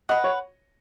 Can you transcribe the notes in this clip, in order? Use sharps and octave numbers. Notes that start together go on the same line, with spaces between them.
B4 D#5 F#5
C#5